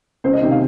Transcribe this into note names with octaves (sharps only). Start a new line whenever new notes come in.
C#2 C5
D#5
C3 D#3
F5